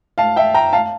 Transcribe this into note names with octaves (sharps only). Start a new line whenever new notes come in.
F5 A5
E5 G5
G5 A#5
F5 A5